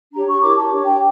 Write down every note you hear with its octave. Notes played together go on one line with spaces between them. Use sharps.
D4 G4 C#5 A#5
C#6
E4 G4 A#4 C#5 D6
A5
D4 G4 C#5
G5